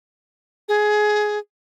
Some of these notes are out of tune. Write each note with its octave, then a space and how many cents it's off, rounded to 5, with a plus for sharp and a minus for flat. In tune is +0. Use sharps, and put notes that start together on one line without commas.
G#4 +15